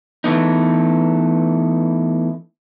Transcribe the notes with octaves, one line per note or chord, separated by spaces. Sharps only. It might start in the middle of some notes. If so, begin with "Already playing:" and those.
E3 A3 B3 D#4